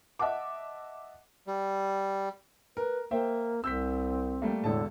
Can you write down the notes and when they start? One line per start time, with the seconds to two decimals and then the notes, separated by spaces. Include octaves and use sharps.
0.19 D#5 E5 F#5 A5 D6
1.47 G3
2.77 A#4 B4
3.11 A#3 C5 E5 G5
3.64 C2 C4 E6 G6 B6
4.42 G3 A3 A#3
4.64 E1 A2 D3 A4 A5